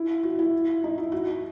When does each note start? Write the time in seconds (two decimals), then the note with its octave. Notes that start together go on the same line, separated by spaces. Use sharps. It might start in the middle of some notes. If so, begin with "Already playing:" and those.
Already playing: E4
0.23 F#4
0.39 E4
0.84 D#4
0.98 E4
1.12 F#4
1.27 F#4